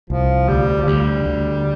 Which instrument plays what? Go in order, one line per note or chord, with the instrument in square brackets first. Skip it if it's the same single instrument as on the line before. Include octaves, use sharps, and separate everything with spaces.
[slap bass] C2 [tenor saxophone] F3
[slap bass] D2 [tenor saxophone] G3
[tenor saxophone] F3
[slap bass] D2 [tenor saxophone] G3
[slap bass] D2